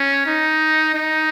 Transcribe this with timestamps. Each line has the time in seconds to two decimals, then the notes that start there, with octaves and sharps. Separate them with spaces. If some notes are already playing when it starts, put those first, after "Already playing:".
Already playing: C#4
0.26 D#4
0.94 D#4